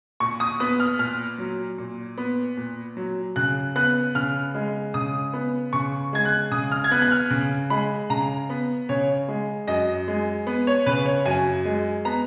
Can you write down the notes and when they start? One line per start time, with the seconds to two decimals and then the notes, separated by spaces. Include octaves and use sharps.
0.20 A#2 C#6
0.40 D#6
0.60 B3 D#6
0.80 F6
0.99 A#2 F6
1.38 F#3
1.78 A#2
2.18 B3
2.57 A#2
2.97 F#3
3.36 C#3 F#6
3.76 B3 F#6
4.15 C#3 F6
4.54 G#3
4.94 C#3 D#6
5.34 B3
5.73 C#3 C#6
6.13 G#3 G#6
6.25 F#6
6.52 C#3 D#6
6.71 F6
6.84 G#6
6.91 B3 F#6
7.02 F#6
7.11 F6
7.31 C#3
7.70 G#3 B5
8.10 C#3 A#5
8.50 B3
8.89 C#3 C#5
9.28 G#3
9.67 F#2 D#5
10.08 G#3
10.47 B3
10.67 C#5
10.86 C#3 B4
11.06 C#5
11.25 F#2 G#5
11.65 G#3
12.05 B3 A#5